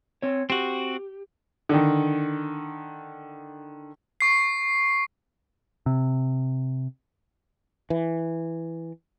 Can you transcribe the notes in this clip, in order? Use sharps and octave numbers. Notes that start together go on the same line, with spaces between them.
C4 C#5
C4 F#4 G4
D3 D#3
C#6 C7
C3
E3